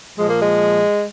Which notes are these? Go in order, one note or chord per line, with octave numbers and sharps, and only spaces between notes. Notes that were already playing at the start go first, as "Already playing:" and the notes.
A#2 F3 G#3
A#3
G#3